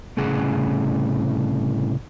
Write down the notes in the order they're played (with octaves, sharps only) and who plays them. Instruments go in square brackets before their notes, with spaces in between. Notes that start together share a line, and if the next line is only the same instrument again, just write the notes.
[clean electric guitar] C2 A2 C#3 G#4 F#5